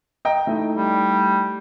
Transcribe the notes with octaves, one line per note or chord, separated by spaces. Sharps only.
D#5 G5 A#5
A3 D#4 E4
G3